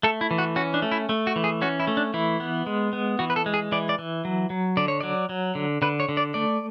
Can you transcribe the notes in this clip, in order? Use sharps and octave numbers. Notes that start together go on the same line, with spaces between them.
A3 A4
E4
E3
F#4
C#4 F#4
D4
A3
E4
A3
F#4
E3
G#4
C#4 F#4
E4
A3
D4
E3 E4
B3
G#3
B3
E3 F#4
B4
A4
G#3
G#4
E3 D5
D5
E3
F#3
F#3
D3 D5
C#5
F#3 D5
F#3
D3
D3 B4
C#5
D3
D5
A3 D5